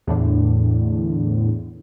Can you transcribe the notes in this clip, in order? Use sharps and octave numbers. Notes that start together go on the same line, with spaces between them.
E2 A2 D3